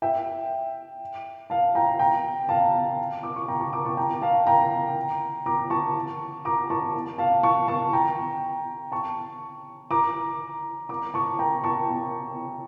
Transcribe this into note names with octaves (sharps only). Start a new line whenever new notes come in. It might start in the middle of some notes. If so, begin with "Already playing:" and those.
E5 G5
F5 A5
G5 A#5
G5 A#5
F5 A5
D6
C#6
G5 A#5
A5 C#6
A#5 D6
A5 C#6
G5 A#5
F5 A5
G5 A#5
A#5 D6
A5 C#6
A#5 D6
A5 C#6
F5 A5
A5 C#6
A5 C#6
G5 A#5
A5 C#6
A#5 D6
A#5 D6
A5 C#6
G5 A#5
A5 C#6